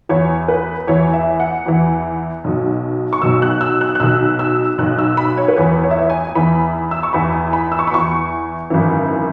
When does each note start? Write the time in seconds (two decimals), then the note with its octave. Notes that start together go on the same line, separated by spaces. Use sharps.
0.09 E2 E3 C#5
0.48 B4
0.87 E2 E3 C#5
1.13 E5
1.40 F#5
1.66 E2 E3
2.44 B1 B2
3.13 C#6
3.22 B1 B2 E6
3.42 F#6
3.61 E6
3.81 F#6
3.95 F#6
4.00 B1 B2 E6
4.39 E6
4.78 B1 B2 F#6
4.99 E6
5.17 B5
5.37 C#5
5.48 B4
5.56 E2 E3 C#5
5.84 C#5
5.91 E5
5.98 C#5
6.10 G#5
6.27 G#5
6.35 E2 E3 B5
6.91 E6
7.03 C#6
7.13 E2 E3 B5
7.33 G#5
7.53 B5
7.72 E6
7.79 C#6
7.87 B5
7.92 E2 E3 C#6
8.70 G#1 F#2 E3